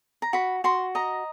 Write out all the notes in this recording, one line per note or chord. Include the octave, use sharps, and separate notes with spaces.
A#5
F#4 B5
F#4 C6
D#5 A#5